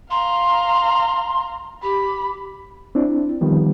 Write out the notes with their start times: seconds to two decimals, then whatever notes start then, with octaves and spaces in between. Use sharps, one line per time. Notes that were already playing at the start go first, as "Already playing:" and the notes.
0.11 F5 A#5 C6
1.83 G4 B5
2.95 C4 D4 E4
3.41 D#3 F3 G3 B3